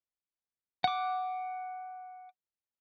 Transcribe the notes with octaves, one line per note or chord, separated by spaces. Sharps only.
F#5 D6